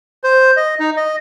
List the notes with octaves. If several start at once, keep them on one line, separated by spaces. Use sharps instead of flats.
C5
D#5
D#4
D#5